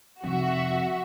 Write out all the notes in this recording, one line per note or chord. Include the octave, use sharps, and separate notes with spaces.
F1 F2 F#4 E5